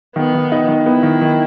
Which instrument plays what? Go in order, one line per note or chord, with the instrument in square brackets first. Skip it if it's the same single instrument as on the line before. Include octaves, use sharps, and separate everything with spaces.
[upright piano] D#3 [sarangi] B3
[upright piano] D#3
D#4
D#3
[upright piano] B3 [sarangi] E4
[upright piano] D#3
D#3